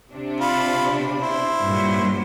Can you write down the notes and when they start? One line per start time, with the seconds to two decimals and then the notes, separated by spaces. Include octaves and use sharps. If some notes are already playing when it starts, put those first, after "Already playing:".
0.11 C3 D4
0.41 F4 B5
1.22 E4 C5
1.62 G2 A#2 F#3